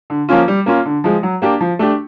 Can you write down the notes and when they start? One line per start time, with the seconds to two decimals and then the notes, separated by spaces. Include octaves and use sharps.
0.10 D3
0.29 F3 A#3 C#4 F4
0.48 G3
0.66 A#3 C#4 F4
0.85 D3
1.04 F3 G#3
1.23 F#3
1.42 A#3 D4 G4
1.61 F3
1.79 A3 D4 G4